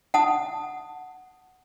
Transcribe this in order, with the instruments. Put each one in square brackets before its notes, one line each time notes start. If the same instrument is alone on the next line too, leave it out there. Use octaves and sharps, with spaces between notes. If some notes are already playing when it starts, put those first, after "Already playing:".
[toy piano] F#5 A5 D#6